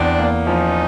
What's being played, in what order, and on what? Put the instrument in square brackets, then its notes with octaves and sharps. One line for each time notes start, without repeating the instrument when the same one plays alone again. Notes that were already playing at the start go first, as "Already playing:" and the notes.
Already playing: [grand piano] E2 [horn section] C4 D4
[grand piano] A#3
[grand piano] F3 [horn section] C#4 D#4